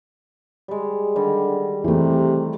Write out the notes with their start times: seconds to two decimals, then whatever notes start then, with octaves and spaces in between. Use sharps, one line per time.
0.68 G3 G#3
1.16 D3 D#3 G3
1.84 C3 E3 A3